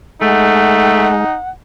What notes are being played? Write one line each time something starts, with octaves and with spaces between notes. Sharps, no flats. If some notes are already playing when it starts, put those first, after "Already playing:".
G#3 A3 D#4 F#5